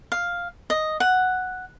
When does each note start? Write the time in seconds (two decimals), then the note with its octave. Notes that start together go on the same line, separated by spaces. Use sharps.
0.12 F5
0.70 D#5
1.00 F#5